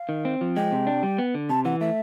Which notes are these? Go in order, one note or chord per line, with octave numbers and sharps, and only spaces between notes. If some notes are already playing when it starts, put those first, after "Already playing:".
Already playing: F5
D#3
C4
F3
G#3 G5
C3
D4
G3
B3
D3
C3 A5
E3 F#5
A3 E5